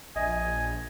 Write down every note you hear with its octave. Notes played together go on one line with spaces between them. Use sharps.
A#1 D#5 G#5